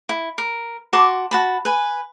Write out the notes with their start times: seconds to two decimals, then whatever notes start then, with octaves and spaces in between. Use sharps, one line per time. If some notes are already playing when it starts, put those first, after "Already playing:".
0.09 E4
0.38 A#4
0.93 F#4 A5 C6 D6
1.31 F#4 A5 B5
1.65 B4 G#5